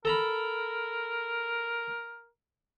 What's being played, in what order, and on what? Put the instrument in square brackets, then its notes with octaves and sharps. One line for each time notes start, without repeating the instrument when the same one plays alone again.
[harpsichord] A4 A#5 B5 [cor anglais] A#4